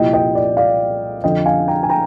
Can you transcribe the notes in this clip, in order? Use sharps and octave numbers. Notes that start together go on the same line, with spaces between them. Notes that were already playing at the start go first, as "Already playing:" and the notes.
Already playing: C2 A#2 F3 D#5 G5
D#5 G5
D5
D5 F5
F2 D3 F3 D#5 G5
F5 G#5
G5 A#5
G#5
G5 A#5